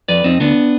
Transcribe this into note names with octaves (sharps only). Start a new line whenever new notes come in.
F2 B4 D5
F2 C4 D#4
D2 B3 D4